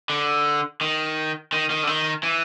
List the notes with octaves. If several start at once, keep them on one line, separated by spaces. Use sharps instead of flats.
D3
D#3
D#3
D#3
D3
D#3
E3